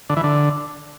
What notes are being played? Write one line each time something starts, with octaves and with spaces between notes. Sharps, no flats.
D3
E3
D3